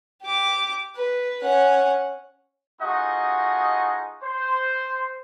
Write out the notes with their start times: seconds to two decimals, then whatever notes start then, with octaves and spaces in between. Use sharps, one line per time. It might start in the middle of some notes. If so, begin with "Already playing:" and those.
0.22 G4 D6
0.96 B4
1.43 C#4 F#5
2.81 A3 D#4 F4 F#4 G#4 D#5
4.22 C5